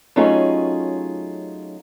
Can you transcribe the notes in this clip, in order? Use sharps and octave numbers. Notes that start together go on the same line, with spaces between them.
F#3 A3 C#4 D#4 F4 G#4